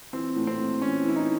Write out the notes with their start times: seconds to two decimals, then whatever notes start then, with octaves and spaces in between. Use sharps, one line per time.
0.13 E3 C4
0.36 A2
0.47 C4
0.59 A2
0.82 E3 C#4
1.04 E3 E4
1.16 D#4